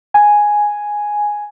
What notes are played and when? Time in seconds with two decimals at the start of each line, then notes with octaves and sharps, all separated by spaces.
0.14 G#5